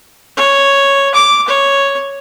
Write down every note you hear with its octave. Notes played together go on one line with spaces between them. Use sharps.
C#5
D6
C#5